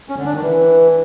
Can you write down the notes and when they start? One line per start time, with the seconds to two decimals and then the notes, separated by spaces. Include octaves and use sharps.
0.09 C#4
0.17 D3
0.25 D4
0.34 D#3
0.42 E3